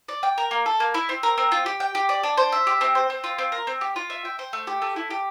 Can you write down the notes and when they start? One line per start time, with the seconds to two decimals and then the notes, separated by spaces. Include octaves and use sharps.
0.08 D5
0.23 G5
0.38 A#4
0.51 A#3
0.66 A4
0.80 A#3
0.94 E4
1.09 C4
1.23 A#4
1.38 C4
1.52 F4
1.66 G4
1.80 G5
1.95 G4
2.09 D5
2.23 D4
2.37 C5
2.52 E5
2.67 G4
2.81 C4
2.95 C5
3.10 C4
3.24 F4
3.38 C4
3.52 A#4
3.67 C4
3.81 G4
3.96 F4
4.10 E5
4.25 G5
4.39 C5
4.53 A3
4.67 G4
4.82 A3
4.96 E4
5.10 G4